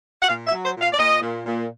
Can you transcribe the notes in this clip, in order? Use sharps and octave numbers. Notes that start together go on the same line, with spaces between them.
F#5
A#2 F5
E5
F#3
C5
A#2
F5
D5
A#2 D#5
A#2
A#2